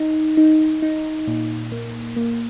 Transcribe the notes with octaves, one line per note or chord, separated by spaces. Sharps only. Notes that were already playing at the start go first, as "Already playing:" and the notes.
Already playing: D#4
D#4
D#4
A#2
A#3
A#3